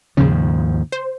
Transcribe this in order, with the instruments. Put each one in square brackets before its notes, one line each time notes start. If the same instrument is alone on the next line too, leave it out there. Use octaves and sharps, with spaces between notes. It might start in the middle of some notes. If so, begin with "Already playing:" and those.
[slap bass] D#2 G#2 F3 [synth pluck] C#3
[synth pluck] C5